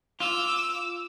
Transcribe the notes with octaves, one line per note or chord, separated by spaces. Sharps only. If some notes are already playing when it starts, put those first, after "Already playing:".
F4 D6 E6